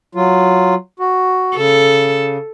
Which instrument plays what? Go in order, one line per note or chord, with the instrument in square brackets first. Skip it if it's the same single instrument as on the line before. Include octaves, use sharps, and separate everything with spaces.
[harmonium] F#3 F4
F#4
[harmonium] C#3 [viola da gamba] A4